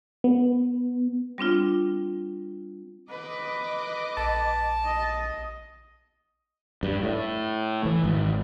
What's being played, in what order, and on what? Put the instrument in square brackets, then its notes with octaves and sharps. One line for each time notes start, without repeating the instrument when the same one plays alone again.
[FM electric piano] B3
[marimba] G3 C4 D4 F4
[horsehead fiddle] B4 [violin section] D#5 D6
[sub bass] A#1 [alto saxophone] A5
[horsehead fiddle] D#5
[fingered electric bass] G2
A2
E3
G#1